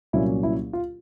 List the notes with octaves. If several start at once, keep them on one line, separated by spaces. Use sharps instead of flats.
C2 A#2 F#3 A#3 C#4 E4
E4
F4